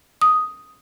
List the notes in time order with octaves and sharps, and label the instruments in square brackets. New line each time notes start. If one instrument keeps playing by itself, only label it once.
[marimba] D#6